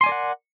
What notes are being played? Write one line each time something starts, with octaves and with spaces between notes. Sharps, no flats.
A#4 D5 F#5 G#5 C6